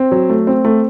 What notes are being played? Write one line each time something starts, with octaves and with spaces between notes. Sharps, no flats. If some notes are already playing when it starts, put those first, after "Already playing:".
Already playing: C4
F#3
A3
C4
A3